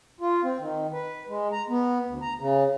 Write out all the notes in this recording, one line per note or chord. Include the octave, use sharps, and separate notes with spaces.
F4
C4
D#3
B4
G#3
A#5
B3
D2
A#5
C#3